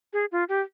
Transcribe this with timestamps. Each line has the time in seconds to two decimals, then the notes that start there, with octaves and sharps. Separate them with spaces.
0.13 G#4
0.32 F4
0.49 G4